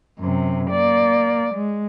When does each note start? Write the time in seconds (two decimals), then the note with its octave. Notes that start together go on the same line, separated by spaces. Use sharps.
0.19 F#2 C3
0.70 A#3 D5
1.54 G#3